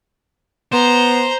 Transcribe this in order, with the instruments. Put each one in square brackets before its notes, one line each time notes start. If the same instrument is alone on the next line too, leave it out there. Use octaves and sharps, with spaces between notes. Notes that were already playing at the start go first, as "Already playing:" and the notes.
[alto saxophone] B3 [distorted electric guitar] C5 [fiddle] A#5